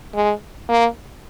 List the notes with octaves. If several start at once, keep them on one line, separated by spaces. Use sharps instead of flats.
G#3
A#3